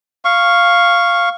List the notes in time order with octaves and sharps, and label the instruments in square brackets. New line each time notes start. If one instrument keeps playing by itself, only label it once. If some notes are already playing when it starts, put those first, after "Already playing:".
[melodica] F5 C#6